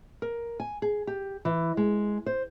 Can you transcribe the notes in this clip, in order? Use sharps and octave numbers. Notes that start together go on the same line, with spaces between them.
A#4
G#5
G#4
G4
E3
G#3
C5